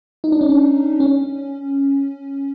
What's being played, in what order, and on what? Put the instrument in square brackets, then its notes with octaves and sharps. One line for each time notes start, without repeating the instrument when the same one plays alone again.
[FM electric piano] D#4
D4
C#4
D4
C#4